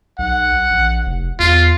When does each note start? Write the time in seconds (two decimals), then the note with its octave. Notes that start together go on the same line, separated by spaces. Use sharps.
0.19 B1 F#5
0.70 A#1
1.06 F1
1.39 E2 F4